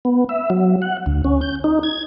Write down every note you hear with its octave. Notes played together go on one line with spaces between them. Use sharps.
B3
E5
F#3
F#5
D2
C#4
G6
D#4
G#6